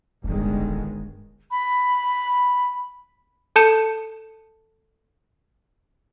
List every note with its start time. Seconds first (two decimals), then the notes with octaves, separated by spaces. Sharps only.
0.24 D1 G1 D#3 G#3
1.51 B5
3.56 A4 A5 G6 C#7 E7